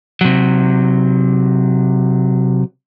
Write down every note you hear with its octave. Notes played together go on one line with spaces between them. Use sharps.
C3 F#3